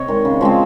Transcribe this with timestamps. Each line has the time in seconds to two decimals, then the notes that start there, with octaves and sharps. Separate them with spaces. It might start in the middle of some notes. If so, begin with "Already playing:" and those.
Already playing: C3 C#5 D#5
0.08 D#3 G#3
0.25 C#3
0.41 F3 G#3 C4